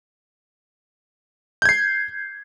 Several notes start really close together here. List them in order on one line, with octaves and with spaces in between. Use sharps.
G6 G#6 C7